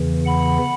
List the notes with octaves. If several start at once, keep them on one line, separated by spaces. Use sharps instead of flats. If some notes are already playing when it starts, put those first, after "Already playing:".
Already playing: E2 C#3 E3
F#5 B5